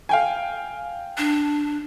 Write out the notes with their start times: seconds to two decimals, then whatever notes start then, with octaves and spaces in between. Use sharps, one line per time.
0.09 F5 G5 G#5
1.18 D4